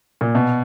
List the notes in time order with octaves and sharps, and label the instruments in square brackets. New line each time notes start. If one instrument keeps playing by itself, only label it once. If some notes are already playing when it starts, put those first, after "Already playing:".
[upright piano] A#2
B2